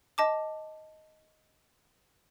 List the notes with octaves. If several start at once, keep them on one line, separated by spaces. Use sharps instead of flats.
D#5 A5 D6